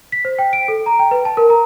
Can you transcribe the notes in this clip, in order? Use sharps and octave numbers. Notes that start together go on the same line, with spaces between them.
B6
C5
G5
D7
A4
A#5
G5
B4
A5
A#4
A#5